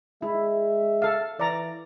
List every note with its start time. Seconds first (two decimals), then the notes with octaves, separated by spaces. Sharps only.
0.22 G#3 E4 E5
1.02 A4 F5
1.39 E3 D5 A#5